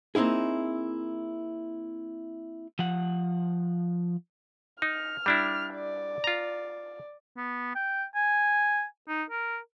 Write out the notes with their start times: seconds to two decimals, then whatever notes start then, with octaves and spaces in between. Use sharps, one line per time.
0.15 A#3 C4 D#4 E4 G#4
2.79 F3 F#5
4.82 D#4 F6
5.26 G3 D4 E4
5.74 D5
6.24 F4 A#5
7.37 B3
7.75 G5
8.15 G#5
9.08 D#4
9.30 A#4